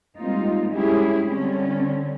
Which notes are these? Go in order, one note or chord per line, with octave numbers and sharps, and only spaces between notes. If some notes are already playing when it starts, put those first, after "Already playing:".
G3 G#3 A#3 C4 D#4 F4
G3 G#3 C#4 E4 G4 G#4
D3 G3 C4 C#4